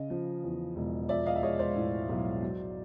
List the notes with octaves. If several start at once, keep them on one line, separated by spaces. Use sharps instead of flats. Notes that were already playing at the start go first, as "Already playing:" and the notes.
Already playing: C#3 D#5
F3
E2
E1
F3 D5 E5
D#5 F5
E5
G#3 C#5 D#5
C5 D5
A2
B1
F#3